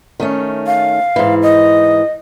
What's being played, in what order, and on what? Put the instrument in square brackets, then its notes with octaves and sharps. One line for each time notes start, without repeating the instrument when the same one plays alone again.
[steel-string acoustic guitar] D#3 A3 C#4
[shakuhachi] F5
[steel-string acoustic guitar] G#2 E3
[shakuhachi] D#5